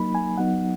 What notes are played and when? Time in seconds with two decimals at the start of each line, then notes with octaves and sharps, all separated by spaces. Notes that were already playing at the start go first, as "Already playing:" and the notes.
Already playing: F#3 A#3 D#4 B5
0.15 G#5
0.38 F#3 B3 D#4 F#5